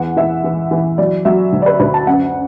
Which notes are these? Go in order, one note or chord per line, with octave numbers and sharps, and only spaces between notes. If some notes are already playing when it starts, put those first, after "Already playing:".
Already playing: E2 F#5
E3 E5
E3
E3
F#3 D5
F#3 E5
D2
D5
B4
D2 B4
A5
F#2 F#5